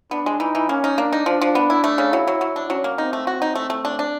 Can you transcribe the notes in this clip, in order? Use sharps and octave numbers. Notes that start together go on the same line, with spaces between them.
B3 D4
G#3
E3 D#4
E3
A#3 C#4
D#4
A#3 D4
D#4
F3 D4
F3
B3
E4
A3
C#3
F#3 E4
F#3
F#3
D4
F#3 C#4
A#3
C4 D#4
A3
F#4
D#4
A3
A3
D4
D4